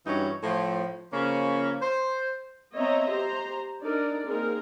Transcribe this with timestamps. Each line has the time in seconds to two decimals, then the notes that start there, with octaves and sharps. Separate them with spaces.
0.06 G2 E3 C#4 D#4 F#4
0.43 A2 F3
1.13 C#3 F3 A#3 C#4
1.81 C5
2.74 B3 C4 C#5 D#5 E5 A#5
3.09 G4 C5 A#5
3.82 D4 D#4 A#4 D5
4.26 A#3 C4 D#4 G#4 A#4